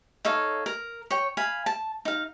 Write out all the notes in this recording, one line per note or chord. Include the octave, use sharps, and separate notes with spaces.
D#4 A4 C#5 F5
A#4
C#5 G5
F5 G#5 B5
A5
D#4 F5